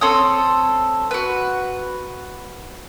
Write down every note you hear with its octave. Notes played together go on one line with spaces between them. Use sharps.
C4 A4 C#5 D#6
F#4 B4